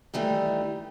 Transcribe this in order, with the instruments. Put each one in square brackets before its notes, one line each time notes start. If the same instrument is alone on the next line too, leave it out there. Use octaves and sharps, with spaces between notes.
[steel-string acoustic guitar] D#3 E3 G3 A3